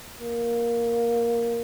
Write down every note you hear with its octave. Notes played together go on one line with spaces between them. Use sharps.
A#3